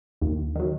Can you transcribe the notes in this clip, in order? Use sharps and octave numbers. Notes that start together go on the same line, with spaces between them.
D#2
D#3 F#3